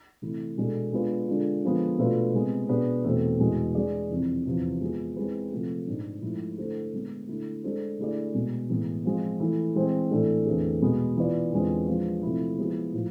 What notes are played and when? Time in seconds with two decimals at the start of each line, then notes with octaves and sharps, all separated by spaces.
0.22 C3 E3 A3 E4
0.57 B2 G#3 B3 D4 A4
0.92 G#3 B3 D4 F4 B4
1.28 D3 G#3 D4 F4
1.63 D3 F3 G#3 B3
1.98 B2 A3 D4 F4 B4
2.34 C3 G#3 B3
2.69 B2 B3 D4 G#4 B4
3.05 E2 B2 A3 C4
3.40 E2 B2 G#3
3.75 G#3 D4 G#4 D5
4.10 F2 C3 E3
4.46 E2 C3 F3
4.81 G#3 B3 F4 G#4
5.16 G#3 C4 E4 G#4 B4
5.52 C3 F3 A3
5.87 G#2 G#3 D4
6.22 G#2 F3 A3 E4
6.58 D3 A3 E4 A4 C5
6.93 D3 G#3 B3
7.28 D3 A3 E4
7.64 G#3 D4 A4 C5
7.99 D3 A3 E4 G#4 D5
8.34 B2 G#3 B3
8.70 A2 E3 G#3 B3
9.05 F3 G#3 C4 F4
9.40 E3 A3 E4
9.76 E3 G#3 C4
10.11 A2 E3 A3 D4 A4
10.46 E2 D3 A3 C4 G#4
10.82 B2 G#3 B3
11.17 E3 B3 F4 B4 D5
11.52 E2 D3 G#3 C4 F4
11.87 F3 G#3 D4
12.23 C3 F3 A3 E4
12.58 F3 G#3 B3 E4 G#4
12.94 A2 F3